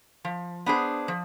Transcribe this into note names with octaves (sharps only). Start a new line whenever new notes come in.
F3
B3 D4 G#4 C5
F3